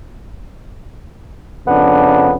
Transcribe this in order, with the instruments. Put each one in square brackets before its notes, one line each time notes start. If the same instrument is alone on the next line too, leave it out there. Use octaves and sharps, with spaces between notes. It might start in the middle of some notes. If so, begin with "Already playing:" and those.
[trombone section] F2 C#3 D4 [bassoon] B3